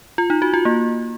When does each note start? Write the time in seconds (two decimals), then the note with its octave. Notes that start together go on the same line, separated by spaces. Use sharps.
0.18 F4
0.30 D#4
0.42 F#4
0.54 F4
0.65 A#3